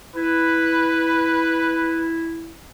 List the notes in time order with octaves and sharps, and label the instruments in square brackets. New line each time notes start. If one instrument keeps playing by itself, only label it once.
[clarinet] E4 [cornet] B4